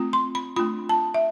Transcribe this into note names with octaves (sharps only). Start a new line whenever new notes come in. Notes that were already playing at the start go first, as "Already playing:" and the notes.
Already playing: A3 C4 F4
C6
B5
A3 D4 F4 B5
A5
E5